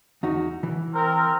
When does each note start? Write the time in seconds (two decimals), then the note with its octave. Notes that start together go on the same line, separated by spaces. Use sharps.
0.23 E2 D#4 F#4
0.63 E3
0.94 C4 A#4